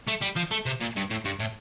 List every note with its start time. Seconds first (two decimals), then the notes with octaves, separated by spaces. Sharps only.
0.08 A3
0.22 G3
0.36 F3
0.51 A3
0.66 C3
0.80 A#2
0.96 G2
1.10 A2
1.25 G2
1.40 A2